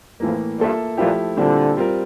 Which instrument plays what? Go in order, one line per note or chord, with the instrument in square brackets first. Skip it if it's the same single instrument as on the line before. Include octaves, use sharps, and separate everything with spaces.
[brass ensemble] F2 [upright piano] A2 E3 A#3
[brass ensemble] G2 [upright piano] A#3 F4 A4 E5
[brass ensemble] A#2 [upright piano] F3 A3 E4 G4
[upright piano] A#2 G3 C4 E4 [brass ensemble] D3
[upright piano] G3 C4 F4 A#4